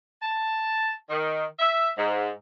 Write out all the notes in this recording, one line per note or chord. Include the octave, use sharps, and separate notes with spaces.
A5
D#3
E5
G#2